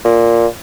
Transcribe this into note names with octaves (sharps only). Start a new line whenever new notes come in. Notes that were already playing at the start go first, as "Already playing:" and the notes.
A#2